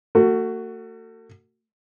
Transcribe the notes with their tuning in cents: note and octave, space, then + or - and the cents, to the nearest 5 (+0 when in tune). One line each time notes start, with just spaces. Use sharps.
A3 +40 F#4 +10